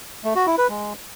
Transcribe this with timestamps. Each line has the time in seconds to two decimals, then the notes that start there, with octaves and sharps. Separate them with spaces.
0.24 A3
0.35 F#4
0.47 E4
0.58 B4
0.69 G#3